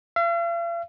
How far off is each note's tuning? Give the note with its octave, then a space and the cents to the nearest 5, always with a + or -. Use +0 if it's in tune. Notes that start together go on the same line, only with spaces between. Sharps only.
F5 -45